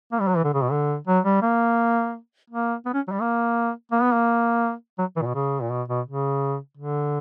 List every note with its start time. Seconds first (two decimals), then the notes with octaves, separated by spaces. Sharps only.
0.12 A#3
0.21 G3
0.28 F#3
0.36 E3
0.44 D3
0.54 C#3
0.63 B2
0.71 D3
1.07 F#3
1.25 G3
1.42 A#3
2.50 A#3
2.86 B3
2.94 C#4
3.08 F#3
3.12 G3
3.21 A#3
3.92 A#3
4.02 B3
4.13 A#3
4.99 F#3
5.17 E3
5.22 A#2
5.26 B2
5.35 C#3
5.62 A#2
5.70 B2
5.89 B2
6.07 C#3
6.77 D3